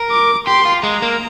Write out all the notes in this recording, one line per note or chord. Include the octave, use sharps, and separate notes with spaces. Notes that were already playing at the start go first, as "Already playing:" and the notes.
Already playing: A#4
D6
G4 C6
F4
G#3 A#5
A#3